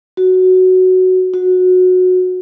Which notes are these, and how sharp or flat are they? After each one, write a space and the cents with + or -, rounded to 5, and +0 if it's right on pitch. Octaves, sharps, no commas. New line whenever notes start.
F#4 +5
F#4 -15